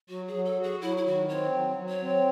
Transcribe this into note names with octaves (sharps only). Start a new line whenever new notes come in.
F#3 F#4
G#4
F#3
A4
F#4
G#4
F#3 E4
E4
D#3 F#4
C4 C#5
F#3
F#3
C#5
C4